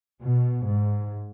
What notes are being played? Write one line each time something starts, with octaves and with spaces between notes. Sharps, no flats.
B2
G#2